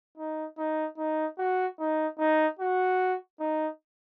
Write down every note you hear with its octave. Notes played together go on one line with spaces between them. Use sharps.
D#4
D#4
D#4
F#4
D#4
D#4
F#4
D#4